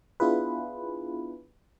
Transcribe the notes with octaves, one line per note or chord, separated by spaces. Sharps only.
B3 D4 E4 F4 G#4 B4